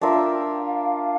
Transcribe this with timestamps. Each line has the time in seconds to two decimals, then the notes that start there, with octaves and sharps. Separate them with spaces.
0.01 D4 F4 A#4 E5 G5
0.60 F5